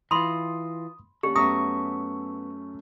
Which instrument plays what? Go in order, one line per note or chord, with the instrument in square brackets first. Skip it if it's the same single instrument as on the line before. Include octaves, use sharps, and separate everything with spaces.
[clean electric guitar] E3 F4 [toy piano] B5 C6 [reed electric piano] D#6
[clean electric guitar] D3 [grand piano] A#3 C#4 [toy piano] G4
[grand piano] F#2 A3 C#4 [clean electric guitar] B3 E5 A#5 [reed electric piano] C#6 [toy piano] D#6